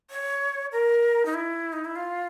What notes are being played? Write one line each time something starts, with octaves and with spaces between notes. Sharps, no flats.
C#5
A#4
D#4
E4
D#4
E4
F4